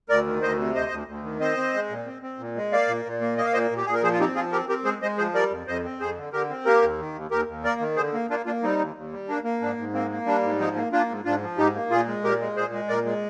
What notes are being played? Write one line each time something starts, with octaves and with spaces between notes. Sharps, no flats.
D2 A#4 D5
D#3
D2 C5 D#5
C3
D2 C5 D#5
D2
D2
D#3
C4 C5 D#5
C4
G#3
A#2
C4
C4
A#2
G#3
A#3 D5 F5
A#2
A#2
A#3
A#3 D#5
F5
A#2 C5 D#5
A#2
G4
A#2 G#4
A#4
F3 G#4 C5
F4
C4 D#4 G4
F3 F4 G#4
C4 G4 A#4
C4 G4 A#4
G#3 G#4 C5
G#3 C5 D#5
F3 G#4 C5
G3 A#4 D5
F2
F2 C5 D#5
C4
F2 G#4 C5
D3
D3 G4 A#4
C4
A#3 G4 A#4
D#2
D#3
D#2
D#2 G4 A#4
D#2
A#3 A#4 D5
D#3
D3 G#4 C5
A#3
A#3 D4 F4
A#3 D4 F4
G3 C4 D#4
D#2
D#2
G3
A#3 D4
A#3
G#2 D4
G#2
A#3 C4
A#3
G3 D4
G#2
F3 C4 D#4
A#3
A#3 D4 F4
G#2
G#2 D4 F4
F3
G#2 D#4 G4
A#3
A#2 F4 G#4
G#3
A#2 G4 A#4
G#3
A#2 G#4 C5
G#3
A#2 A#4 D5
G#3